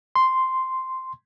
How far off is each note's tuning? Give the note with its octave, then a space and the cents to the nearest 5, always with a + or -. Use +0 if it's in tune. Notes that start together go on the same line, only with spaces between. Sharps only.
C6 -5